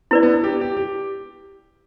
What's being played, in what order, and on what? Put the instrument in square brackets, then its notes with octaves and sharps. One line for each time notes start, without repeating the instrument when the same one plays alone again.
[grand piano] B3 [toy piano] E4 B4 D5
[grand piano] B3
D4
G4
G4
G4